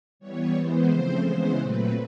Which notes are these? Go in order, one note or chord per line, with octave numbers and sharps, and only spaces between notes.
E3 G3 B3 C#5
E3 G#3 B3 C5
C#3 F3 A3 C4
C#3 E3 G#3 B3 C5
A#2 F#3 A3 C4 B4